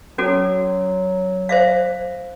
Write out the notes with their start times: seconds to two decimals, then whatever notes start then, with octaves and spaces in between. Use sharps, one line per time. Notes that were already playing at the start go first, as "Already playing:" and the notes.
0.18 F#3 C#4 F#4 A4
1.49 C5 E5 F5